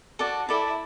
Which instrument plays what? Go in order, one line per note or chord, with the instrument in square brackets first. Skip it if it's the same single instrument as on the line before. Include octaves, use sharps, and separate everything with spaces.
[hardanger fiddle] F#4 [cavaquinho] A4 D5 A5
[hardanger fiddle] E4 [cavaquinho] A4 D5 A5